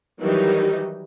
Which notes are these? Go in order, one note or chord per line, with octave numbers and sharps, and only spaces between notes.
D#3 E3 F#3 G3 D#4 G4